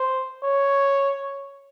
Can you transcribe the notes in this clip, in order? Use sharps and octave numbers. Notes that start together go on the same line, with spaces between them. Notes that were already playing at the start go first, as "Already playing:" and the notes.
Already playing: C5
C#5